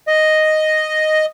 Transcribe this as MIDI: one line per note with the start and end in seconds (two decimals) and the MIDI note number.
0.08 1.26 75